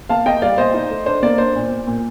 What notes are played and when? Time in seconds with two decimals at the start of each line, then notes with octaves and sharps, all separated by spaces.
0.09 A#3 F5 A5
0.26 A#3 D#5 G5
0.42 G3 D5 F5
0.58 A#2 C5 D#5
0.74 D#4
0.90 A3
1.06 D4 C5
1.23 A#3 D5
1.38 D4 C5
1.55 A#2
1.71 A#2
1.87 A#2